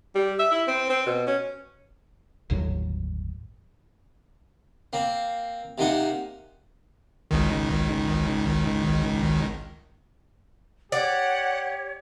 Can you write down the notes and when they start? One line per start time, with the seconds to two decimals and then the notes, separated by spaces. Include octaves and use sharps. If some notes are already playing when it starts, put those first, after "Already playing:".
0.15 G3
0.39 E5
0.51 E4
0.67 C4
0.89 C4
1.06 B2
1.27 C#4
2.50 G1 D#2 A2 F#3
4.93 A#3 C4
5.78 C3 A#3 D#4 F#5
7.31 G#1 C#2 D#3
10.92 G4 C#5 D5 F#5